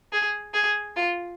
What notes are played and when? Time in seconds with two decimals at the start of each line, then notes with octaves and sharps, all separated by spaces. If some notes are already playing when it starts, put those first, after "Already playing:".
0.12 G#4
0.54 G#4
0.96 F4